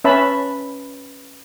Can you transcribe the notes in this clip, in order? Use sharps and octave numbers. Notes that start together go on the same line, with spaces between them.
C#4 B4 E5 A5 B5